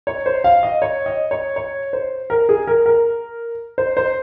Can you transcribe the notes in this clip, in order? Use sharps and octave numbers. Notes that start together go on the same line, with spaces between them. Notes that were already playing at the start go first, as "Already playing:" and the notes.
C#5
C5
F5
D#5
C#5
D#5
C#5
C#5
C5
A#4
G#4
A#4
A#4
C5
C5